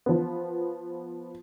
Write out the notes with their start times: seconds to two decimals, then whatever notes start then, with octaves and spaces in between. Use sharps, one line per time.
0.06 F3 B3